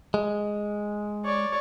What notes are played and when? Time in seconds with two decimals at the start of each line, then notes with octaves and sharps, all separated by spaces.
0.14 G#3
1.24 C#5 D5